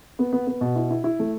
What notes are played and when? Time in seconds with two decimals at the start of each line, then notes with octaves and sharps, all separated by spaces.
0.19 B3
0.33 B3
0.47 B3
0.61 B2
0.76 E4
0.90 E4
1.04 E4
1.19 A3